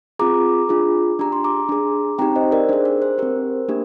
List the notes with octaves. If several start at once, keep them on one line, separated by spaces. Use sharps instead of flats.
C4 F4 G#4 A#5 D6
D4 F4 G#4
D4 G4 A#5
C6
A#5 D6
D4 G#4
C4 D#4 G4 G5 A#5
C5 D#5
A#4 D5
D4 G#4 C5
A#4
C5
C4 G4 A#4
A#3 D4 G4